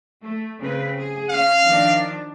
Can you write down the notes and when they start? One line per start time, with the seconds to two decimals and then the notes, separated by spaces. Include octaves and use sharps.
0.22 A3
0.60 C#3 C4 B4
0.98 G#4
1.29 C#4 F5
1.65 D#3 F3 D4